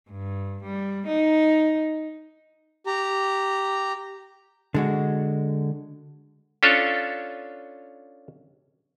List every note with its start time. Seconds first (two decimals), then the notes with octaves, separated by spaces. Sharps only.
0.10 G2
0.64 G3
1.07 D#4
2.86 G4 A#5
4.74 D3 G#3 F#4
6.63 C#4 D4 F4 A4 C#5